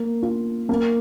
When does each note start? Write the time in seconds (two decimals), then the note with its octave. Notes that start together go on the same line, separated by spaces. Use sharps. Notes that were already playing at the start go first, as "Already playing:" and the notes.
Already playing: A#3
0.22 F4
0.69 A#3